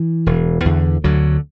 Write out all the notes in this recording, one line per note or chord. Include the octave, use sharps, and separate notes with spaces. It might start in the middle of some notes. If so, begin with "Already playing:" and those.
Already playing: E3
E1
E2 D3
D2 D3 F#3